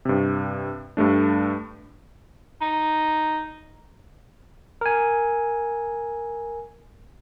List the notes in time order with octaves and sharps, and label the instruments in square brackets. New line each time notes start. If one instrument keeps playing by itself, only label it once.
[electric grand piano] G2 C3
G2 G3 A3 D4
[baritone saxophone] D#4
[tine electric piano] A#4 G#5